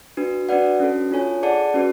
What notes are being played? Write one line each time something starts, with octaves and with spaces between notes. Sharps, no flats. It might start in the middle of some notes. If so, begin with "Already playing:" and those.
D4 F#4 B4
D4 F#4 B4 D5 F#5
C#4 F#4 A4
D4 F4 A4 C#5 G#5
G#4 D5 F#5 A5
C#4 F#4 B4